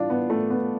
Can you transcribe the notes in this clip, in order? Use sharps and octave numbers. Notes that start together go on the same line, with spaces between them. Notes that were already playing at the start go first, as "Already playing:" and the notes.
Already playing: A2 E3 G3 D4 F4
B3
A3
B3